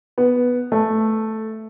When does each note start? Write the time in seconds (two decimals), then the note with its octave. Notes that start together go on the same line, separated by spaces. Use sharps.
0.18 B3
0.72 A3